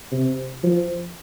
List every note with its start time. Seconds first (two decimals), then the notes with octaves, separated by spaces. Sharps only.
0.12 C3
0.64 F3